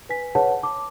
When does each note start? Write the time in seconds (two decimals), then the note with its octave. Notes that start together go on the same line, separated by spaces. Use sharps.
0.09 B4 G#5 B6
0.35 G#4 B4 C#5 F#5 A5
0.63 A5 D6